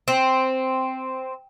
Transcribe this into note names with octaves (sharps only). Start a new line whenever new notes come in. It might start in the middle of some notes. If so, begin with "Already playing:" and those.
C4